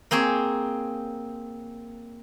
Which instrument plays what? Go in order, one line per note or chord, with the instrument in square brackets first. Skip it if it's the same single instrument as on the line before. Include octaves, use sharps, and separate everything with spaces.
[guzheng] A#3 C4 G#4 C#5